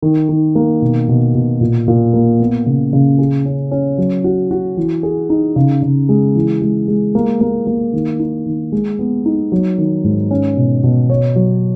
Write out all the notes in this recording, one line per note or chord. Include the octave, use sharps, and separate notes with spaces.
D#3
D#3
A#3
B2
B2
B2
A#2
A#2
A#3
B3
C#3
C#3
G#4
C#4
C#4
F#3
F#4
F#4
E3
G#4
D#4
C#3
C#3
G#3
E3
G#3
G#3
A#3
A#3
A#3
D#3
D#4
D#3
G#3
B3
D#4
F#3
D#3
G#2
C#4
B2
B2
C#5
F#3